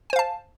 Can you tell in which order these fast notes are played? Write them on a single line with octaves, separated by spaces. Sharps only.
G#5 C5 F5 A5